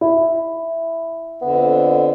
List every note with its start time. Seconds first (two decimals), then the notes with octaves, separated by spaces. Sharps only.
0.01 E4
1.42 F2 D3 B3